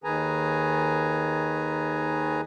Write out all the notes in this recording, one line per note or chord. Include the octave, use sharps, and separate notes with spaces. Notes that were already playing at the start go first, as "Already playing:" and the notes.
D#2 D#3 G#4 B4 G#5 A#5